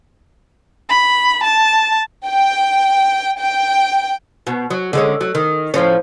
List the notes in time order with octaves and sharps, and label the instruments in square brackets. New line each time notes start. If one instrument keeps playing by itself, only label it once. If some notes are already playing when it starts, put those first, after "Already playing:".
[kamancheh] B5
A5
[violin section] G5
G5
[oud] B2
F#3
D3 G#3 C#4
F#3
D#3
A2 F3 C#4